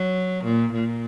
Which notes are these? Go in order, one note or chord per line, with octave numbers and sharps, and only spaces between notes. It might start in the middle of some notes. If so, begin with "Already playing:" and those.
Already playing: F#3
A#2
A#2